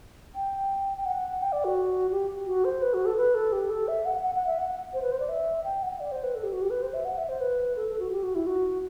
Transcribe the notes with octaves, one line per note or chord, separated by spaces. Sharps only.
G5
G5
F#5
G5
D5
F#4
G4
F#4
C5
B4
F#4
A4
B4
A4
G4
A4
E5
F#5
F#5
F#5
E5
F#5
C5
B4
C5
D5
E5
G5
F#5
D5
C5
B4
A4
G4
F#4
G4
B4
C5
E5
F#5
E5
C5
B4
A4
A4
F#4
G4
F#4
E4
F#4